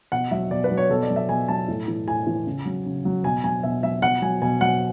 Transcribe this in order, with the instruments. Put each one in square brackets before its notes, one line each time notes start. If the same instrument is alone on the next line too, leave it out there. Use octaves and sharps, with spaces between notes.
[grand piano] B2 F#5
F#3 E5
B2 D5
B4
F#3
C#5
B2 A4
D5
F#3
E5
B2 G#5
F#3 A5
A2
E3
A2 G#5
E3
C#3
F#3
C#3
F#3
B2 G#5
F#3 G#5
B2 E5
F#3 E5
B2 F#5
F#3 G#5
B2 G#5
F#3 F#5